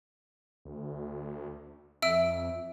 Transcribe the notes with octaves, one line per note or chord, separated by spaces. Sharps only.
D2
F2 E5 E6 D7